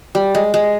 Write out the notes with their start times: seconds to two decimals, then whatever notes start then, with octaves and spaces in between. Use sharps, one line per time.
0.15 G3
0.35 G#3
0.54 G#3